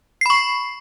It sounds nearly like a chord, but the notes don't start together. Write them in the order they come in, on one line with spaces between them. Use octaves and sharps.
C7 B5 C#6